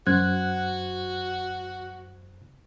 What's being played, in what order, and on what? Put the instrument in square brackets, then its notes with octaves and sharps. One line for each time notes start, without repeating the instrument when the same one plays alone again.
[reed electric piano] F#2 C5 [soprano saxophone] F#4 [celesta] F#6 G#6